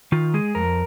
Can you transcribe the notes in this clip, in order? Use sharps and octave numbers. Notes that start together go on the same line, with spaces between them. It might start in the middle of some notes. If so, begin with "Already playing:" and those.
D#3 F4
G#3 G#4
F2 A#4